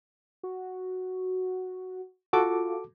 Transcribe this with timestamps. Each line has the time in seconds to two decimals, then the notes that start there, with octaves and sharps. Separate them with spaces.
0.43 F#4
2.33 F4 F#4 A4 D6